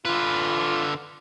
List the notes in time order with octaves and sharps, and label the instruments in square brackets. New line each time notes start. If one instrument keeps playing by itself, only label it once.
[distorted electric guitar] D3 B4 [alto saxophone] F4